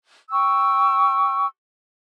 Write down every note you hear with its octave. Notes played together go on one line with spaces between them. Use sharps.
G5 C#6 E6